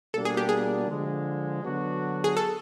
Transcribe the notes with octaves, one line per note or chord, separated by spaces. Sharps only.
B2 G3 A#3 D4 A4
G#4
G4
G#4
D3 F3 G#3
D3 F#3 B3 D4 F#4
G#4
A4